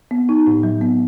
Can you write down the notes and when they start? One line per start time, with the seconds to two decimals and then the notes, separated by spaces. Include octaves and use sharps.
0.11 B3
0.29 D#4
0.47 A2
0.63 F#3
0.81 B3